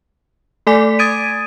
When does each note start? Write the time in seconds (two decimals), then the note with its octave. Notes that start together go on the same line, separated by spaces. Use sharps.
0.67 A3 A4 D5 G#5 D6 B6
0.99 D#6 G#6 A6 D7 D#7